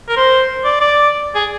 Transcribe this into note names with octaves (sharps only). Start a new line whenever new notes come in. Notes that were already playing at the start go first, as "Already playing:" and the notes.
A#4
C5
D5
D5
G#4